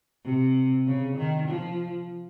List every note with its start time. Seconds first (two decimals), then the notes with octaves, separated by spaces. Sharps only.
0.24 C3
0.87 C#3
1.17 D#3
1.48 F3